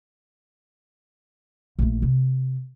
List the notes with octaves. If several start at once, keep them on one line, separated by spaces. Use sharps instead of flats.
A#1 A3
C3